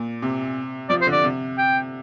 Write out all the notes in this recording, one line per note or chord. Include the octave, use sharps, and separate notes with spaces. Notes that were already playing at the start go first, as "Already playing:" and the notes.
Already playing: A#2
C3
F3 D5
C5
D3 D5
C3
G5